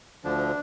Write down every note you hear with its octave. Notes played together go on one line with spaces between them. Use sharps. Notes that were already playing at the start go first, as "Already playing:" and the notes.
D2 D3 F3 D4